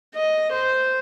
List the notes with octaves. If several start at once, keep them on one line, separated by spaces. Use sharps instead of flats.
D#5
C5